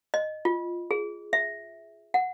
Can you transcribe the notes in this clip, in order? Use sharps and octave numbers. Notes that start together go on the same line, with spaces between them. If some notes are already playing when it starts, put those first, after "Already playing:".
D#5
F4
G#4
E5
F#5